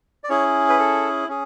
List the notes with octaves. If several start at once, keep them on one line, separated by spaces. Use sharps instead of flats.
D5
C#4 E4 G#4 C#5
B4
A4
C#4 G#4